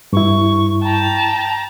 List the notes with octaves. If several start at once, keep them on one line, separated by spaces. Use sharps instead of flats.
G2 E4 C#6
G5 A5 A#5